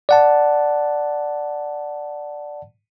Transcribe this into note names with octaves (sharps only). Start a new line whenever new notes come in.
D5 F#5 A5